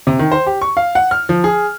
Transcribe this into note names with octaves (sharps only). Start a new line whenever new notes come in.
C3
D#3
C5
G4
C#6
F5
F#5
F6
F3
G#4